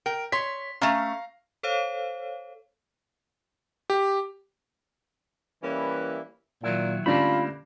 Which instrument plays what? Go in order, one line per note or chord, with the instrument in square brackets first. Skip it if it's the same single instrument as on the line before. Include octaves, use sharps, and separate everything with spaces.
[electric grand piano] A#4 [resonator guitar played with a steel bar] G5
[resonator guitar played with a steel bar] C#5 [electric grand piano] C6 B6
[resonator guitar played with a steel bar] A3 C#4 [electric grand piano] F5 A#5 F6
[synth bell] A4 C5 C#5 F5
[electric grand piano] G4
[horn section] E3 G3 A#3 C#4 E4 B4
[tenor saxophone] A#2 [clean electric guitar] D#3 F#3 E4
[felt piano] D3 G3 C#4 [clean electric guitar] A3 A#3 D4 [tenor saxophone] F4 [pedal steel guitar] B5